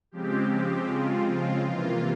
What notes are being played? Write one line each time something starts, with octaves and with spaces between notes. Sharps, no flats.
C#3 F3 G#3 C4 G4
G4
F4
F4
C3 E3 A#3 F4